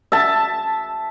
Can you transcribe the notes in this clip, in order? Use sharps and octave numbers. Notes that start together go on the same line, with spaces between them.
E5 A5